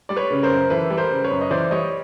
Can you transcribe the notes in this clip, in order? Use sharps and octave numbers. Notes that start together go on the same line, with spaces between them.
G3 D5
B4 C#5
C#3
A#4 C5
F#2
E3 A4 B4
G3
A#4 C5
C#3
B4 C#5
F#2
D#5
E3 C5 D5
G3 C#5 D#5